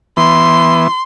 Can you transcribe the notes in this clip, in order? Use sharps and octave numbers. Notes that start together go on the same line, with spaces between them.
E3 B3 C6